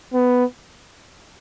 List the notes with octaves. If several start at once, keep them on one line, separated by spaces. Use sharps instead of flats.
B3